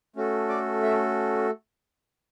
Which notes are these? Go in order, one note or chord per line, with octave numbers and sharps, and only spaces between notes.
A3 C#4 F#4 A4
D5 D6
E5 E6